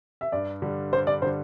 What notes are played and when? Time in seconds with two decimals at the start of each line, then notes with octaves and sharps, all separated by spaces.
0.21 E5
0.32 G2 D5
0.62 D3 G3
0.93 G2 C5
1.07 D5
1.22 D3 C5
1.26 G3